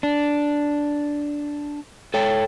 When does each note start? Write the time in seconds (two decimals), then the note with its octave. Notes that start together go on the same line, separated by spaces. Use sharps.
0.03 D4
2.14 A4 C#5 G5